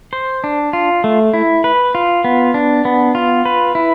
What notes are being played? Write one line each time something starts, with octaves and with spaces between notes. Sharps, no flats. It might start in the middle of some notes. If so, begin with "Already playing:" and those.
C5
D4
F4
A3
E4
B4
F4
B3
D4
B3
F4
B4
E4